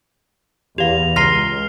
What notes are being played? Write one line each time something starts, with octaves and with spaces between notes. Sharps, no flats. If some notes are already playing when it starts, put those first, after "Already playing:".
E2 G4 F5 F7
C#2 A#5 C6 F6 A#6 C7 G7